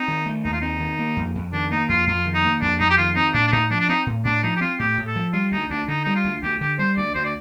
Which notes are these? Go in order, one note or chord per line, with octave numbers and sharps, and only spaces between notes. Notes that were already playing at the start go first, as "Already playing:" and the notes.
Already playing: C4 D#4
D#3
A3
D#2 D#4
F4
C4 D#4
D#3
A#3
F2
F2
D#3 D4
A#3 D#4
F2 F4
F2 F4
D#3
D#4
A#3
F2 D4
F2 D#4
G4
D#3 F4
C4 D#4
A2 D4
D4
A2 D#4
F3 D4
D4
C4 D#4
A2
A2 D4
F3 D#4
G4
C4 F4
A2 G4
A2
A4
F3
G3 F4
D2 D#4
D2 D4
D3 D#4
G3 D#4
F4
D2
D2 G4
D3 G4
G3 C5
D2 D5
D2 C5
D5